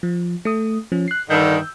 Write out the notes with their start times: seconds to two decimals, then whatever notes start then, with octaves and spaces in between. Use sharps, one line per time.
0.03 F3
0.45 A3 D#6
0.92 F3 C#4
1.08 F#6 C7
1.30 G2 D3 D#3 E6 G6